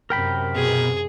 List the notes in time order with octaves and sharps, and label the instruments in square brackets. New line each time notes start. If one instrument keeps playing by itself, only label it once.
[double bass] F#2 C3 [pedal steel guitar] A#4 G5 B5
[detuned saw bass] B2 [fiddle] G#4